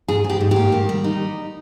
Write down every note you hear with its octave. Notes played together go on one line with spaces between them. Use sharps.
G#2 G#4
G#2
G4
G#2
G4
A#3
D#3
G3
D#4